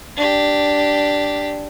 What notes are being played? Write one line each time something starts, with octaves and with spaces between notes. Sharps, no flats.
D4 G4